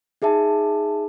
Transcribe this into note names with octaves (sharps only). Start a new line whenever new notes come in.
D#4 G#4 E5 A5